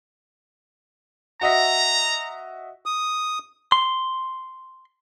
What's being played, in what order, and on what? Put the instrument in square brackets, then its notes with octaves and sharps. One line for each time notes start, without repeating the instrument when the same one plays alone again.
[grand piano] F#4 D#5 E5 [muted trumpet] A#5
[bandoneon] D#6
[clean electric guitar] C6